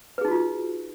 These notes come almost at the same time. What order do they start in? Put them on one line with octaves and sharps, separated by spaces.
B4 G#4 D#4 F#4 F4